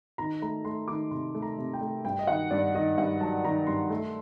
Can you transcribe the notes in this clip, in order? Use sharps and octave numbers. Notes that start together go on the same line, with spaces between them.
D#3 A#5
A3 A#5
A3 C6
D#3 D6
C3 C6
A3
A#5
C3
G5
A3
G2 G5
D#5
D#3 F#5
G2 D5
D#3 D#5
G2 F#5
F#3 A5
D#3 A#5
G2 C6
A3